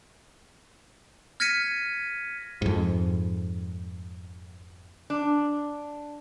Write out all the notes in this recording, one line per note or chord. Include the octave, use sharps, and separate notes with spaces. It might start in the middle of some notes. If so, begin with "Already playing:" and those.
F6 G#6 A#6 B6 C#7 D#7
F2 G#2
D4